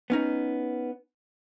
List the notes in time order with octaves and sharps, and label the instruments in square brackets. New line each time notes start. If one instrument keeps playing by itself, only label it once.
[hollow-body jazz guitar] B3 C#4 D#4